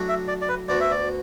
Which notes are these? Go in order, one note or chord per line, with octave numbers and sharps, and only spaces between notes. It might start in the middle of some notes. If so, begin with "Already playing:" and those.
Already playing: A2 F#3 D4 F#4
E5
D5
D5
B4
D2 D3 B3 F#4 D5
E5
D5